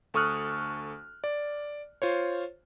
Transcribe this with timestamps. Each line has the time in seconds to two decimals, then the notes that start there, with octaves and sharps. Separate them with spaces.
0.14 D2 A4 C#6 D#6 F6 F#6
1.24 D5
2.02 F4 C5 C#5